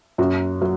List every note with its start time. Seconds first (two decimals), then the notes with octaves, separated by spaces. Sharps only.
0.18 F#2 F#4
0.62 F#3